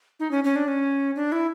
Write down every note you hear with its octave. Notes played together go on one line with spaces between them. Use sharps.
D#4
C#4
C#4
D4
C#4
D4
E4